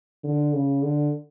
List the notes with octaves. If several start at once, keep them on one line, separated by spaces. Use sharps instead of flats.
D3
C#3
D3